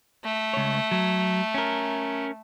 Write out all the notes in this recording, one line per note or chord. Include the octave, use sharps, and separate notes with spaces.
A3
C#2 C#5
F#3
C#4 A#4